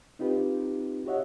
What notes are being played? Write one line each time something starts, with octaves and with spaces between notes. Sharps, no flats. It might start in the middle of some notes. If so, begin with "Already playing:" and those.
C4 D#4 F4 G4 B4
F#4 G4 C#5 D#5 E5 F#5